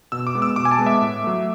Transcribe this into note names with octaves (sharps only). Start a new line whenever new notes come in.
B2 E6
D6
G#3 B3
E6
B2 D6
G#5
A5
G#3 B3
E5
A2
F#3 A3